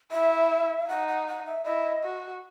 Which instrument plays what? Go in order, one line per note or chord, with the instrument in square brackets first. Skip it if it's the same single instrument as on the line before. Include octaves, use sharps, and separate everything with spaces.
[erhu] E4 [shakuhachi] E5
[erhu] D#4 [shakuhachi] F#5
[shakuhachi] F#5
F#5
E5
[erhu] E4 [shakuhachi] D#5
[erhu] F#4